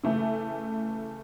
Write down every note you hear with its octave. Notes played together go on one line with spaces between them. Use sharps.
C#3 E3 A3 A4